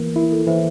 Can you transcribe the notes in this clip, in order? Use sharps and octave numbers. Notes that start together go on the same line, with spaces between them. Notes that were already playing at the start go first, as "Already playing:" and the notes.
Already playing: E3 A#3 A#4
E4 A#4
A4
E3 C5 E5